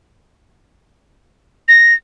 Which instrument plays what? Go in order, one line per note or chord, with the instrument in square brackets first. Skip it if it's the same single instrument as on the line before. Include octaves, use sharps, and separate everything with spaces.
[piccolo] A#6